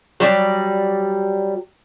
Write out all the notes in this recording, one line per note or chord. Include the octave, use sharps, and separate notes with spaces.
F#3 G3 D5